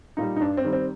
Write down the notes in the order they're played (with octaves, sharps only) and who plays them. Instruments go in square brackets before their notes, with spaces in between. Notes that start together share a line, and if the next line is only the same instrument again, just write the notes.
[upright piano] A#2 G3 D#4
D#4
G2 D4
C4
D#3 G3
C4